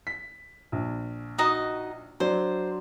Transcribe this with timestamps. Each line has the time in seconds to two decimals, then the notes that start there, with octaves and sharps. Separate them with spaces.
0.07 B6
0.72 A#1
1.38 D#4 F#4 D#5
2.20 F#3 D4 C5